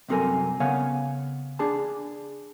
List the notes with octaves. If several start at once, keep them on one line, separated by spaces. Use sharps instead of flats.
C2 F#2 C4 A4 A#4 G#5
C#3 B3 C#5 F5 F#5 G#5
D4 G#4 A5